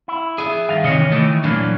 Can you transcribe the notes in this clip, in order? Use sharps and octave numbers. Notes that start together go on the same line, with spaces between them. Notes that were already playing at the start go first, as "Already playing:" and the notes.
E4
G#4 E5
G2 D#3 F5
C3 D#3 E3 C#5 D#5
D#3 E3 A3
A#2 E3 F#3 A#3 D4